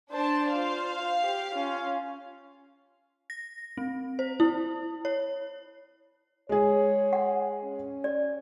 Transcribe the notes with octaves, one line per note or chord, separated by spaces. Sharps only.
D4 C5 A5
F4 C5 F5
G4
C#4 F4
A#6
C4
C5
E4
C#5
G#3 G#4 C#5
F#5
C#4
D5